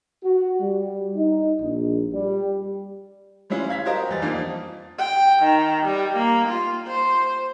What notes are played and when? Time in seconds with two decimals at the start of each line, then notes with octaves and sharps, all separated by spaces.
0.24 F#4
0.61 G3
1.16 D#4
1.61 A#1
2.13 G3
3.50 G3 G#3 C#4 E4 F4
3.69 F5 G#6 B6
3.85 F#4 G4 A#4 C5 D#5 F5
4.09 E2 G3 A6
4.22 F2 A#3 D4 D#4 F4
4.98 G5
5.43 D#3
5.86 G3
6.17 A#3
6.48 F4
6.87 C5